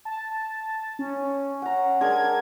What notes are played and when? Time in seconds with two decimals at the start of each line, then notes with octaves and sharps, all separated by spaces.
0.05 A5
0.99 C#4
1.62 F#5 A#5
2.01 G#3 D4 A#4 G#6